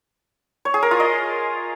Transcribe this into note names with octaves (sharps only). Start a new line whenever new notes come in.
C#5
G#4
A#4
F4
D#5